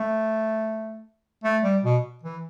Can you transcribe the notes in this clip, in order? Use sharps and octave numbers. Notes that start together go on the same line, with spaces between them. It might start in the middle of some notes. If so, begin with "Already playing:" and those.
Already playing: A3
A3
G3
B2
E3